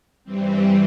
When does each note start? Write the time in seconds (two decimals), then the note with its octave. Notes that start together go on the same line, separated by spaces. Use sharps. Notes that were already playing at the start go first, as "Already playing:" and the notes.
0.24 G2 E3 G3 C4